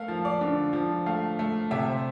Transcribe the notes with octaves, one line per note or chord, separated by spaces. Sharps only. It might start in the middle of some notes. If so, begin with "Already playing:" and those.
Already playing: A3 A4 A#4 F5
F3
D5
D3
F3
A3 F5
A3
C3 E5
C5